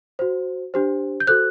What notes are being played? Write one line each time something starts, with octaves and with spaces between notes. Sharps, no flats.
F#4 C5
D4 G4 C5
G6
F#4 A4 C5 F#6